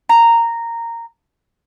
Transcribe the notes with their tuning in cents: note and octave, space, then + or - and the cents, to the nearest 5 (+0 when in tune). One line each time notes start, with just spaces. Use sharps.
A#5 -10